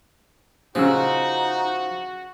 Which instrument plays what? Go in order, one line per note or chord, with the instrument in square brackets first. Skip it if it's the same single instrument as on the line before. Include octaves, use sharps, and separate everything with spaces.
[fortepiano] C#3 C#4 E6 [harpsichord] F3 [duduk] D#4 [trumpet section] F#4